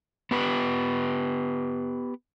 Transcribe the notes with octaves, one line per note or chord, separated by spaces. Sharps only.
B3 G4 B4